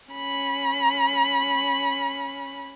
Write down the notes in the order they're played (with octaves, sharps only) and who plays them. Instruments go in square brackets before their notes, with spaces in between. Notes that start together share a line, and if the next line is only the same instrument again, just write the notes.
[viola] C#4 B5